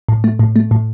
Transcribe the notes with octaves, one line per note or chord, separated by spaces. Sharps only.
A2
A3
A2
A3
A2